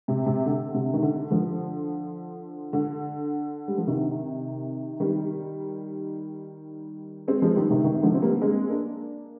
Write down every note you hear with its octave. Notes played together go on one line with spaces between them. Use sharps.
C3
C3
D3
C3
D#3
D3
D3 F3
D3
G3
F3
C3 D#3
D#3 G3
G#3 C4
F3 G#3
D#3 G3
C3 D#3
C3 D#3
D3 F3
C4
G3 A#3
G#3 C4
A#3 D4